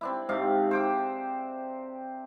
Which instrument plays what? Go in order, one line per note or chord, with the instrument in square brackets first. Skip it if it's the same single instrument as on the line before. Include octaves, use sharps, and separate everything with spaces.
[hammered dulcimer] C4 D4 E4
G#2 C3 D4 F5
C5 G5 D6